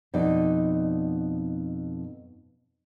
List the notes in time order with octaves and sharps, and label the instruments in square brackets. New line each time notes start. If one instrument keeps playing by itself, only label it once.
[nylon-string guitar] F2 B2 D#4 D5